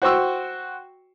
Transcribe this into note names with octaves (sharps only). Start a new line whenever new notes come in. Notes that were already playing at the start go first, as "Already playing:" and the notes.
F#4 C5 G5 C#6 E6